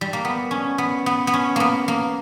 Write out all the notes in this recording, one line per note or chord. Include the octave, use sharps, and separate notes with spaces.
G3
A#3
B3
C#4
B3
B3
B3
C#4
A#3 B3
A#3